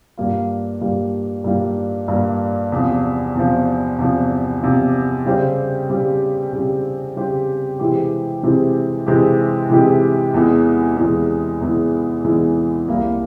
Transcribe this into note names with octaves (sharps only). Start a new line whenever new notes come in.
G2 G3 A#3 F4
G2 G3 A#3 F4
G2 G3 A#3 F4
G2 G3 A#3 F4
E2 C3 F3
E2 C3 F3
E2 C3 F3
E2 C3 F3
C#3 G3 C4 G4 C5
C#3 G3 C4 G4 C5
C#3 G3 C4 G4 C5
C#3 G3 C4 G4 C5
C3 E3 G#3 C4 G4
C3 E3 G#3 C4 G4
C3 E3 G#3 C4 G4
C3 E3 G#3 C4 G4
E2 E3 G#3
E2 E3 G#3
E2 E3 G#3
E2 E3 G#3
C2 C3 G3 A#3 E4